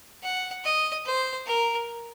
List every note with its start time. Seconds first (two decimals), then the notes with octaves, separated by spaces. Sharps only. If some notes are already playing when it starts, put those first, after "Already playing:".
0.23 F#5
0.64 D#5
1.05 C5
1.46 A#4